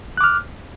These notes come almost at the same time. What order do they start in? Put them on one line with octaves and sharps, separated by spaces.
F#6 D6 F6